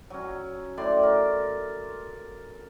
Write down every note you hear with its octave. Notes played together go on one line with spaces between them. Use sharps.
F#3 C#4
A2 D5 C6 D6
A#4